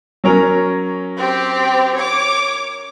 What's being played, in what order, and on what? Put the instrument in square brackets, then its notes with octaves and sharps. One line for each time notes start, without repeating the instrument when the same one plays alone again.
[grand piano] F#3 C#4 A#4
[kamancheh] C4 G4
C#5 D6